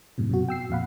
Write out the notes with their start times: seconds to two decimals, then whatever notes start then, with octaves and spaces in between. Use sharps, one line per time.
0.18 F#2 A2 C3
0.29 F#2 B2 F#4
0.49 G5 E6 C7
0.70 F2 A#2 F5 F#5 B5